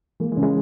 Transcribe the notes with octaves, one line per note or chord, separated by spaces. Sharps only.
E3 G#3 A#3
E3 G#3
C#3
E3 G#3